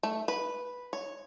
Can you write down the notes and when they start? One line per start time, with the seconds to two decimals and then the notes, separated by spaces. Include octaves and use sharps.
0.03 A3
0.28 B4
0.93 C#5